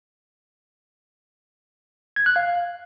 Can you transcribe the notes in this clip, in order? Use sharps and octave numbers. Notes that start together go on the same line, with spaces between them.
G#6
F#6
F5